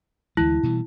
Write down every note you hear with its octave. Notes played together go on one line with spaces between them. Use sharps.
D2 E3 G#3 E4
B2 E3 G3